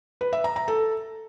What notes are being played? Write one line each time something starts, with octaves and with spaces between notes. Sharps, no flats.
B4
E5
A#5
A#5
A4